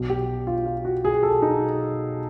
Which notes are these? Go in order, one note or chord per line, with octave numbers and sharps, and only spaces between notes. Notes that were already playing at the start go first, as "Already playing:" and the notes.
Already playing: B1 B2
G4
F4
F4
F#4
G#4
A4
D#4